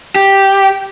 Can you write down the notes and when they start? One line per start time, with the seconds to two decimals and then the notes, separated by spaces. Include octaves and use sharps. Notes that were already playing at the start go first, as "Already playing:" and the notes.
0.16 G4